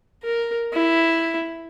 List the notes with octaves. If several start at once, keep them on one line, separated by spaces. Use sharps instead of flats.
A#4
E4